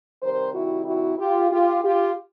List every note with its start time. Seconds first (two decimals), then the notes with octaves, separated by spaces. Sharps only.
0.23 C3 D#3 G3 A#4 C5
0.55 E4 F#4
0.87 E4 F#4
1.19 F4 G4
1.51 F4 G4
1.83 F4 G4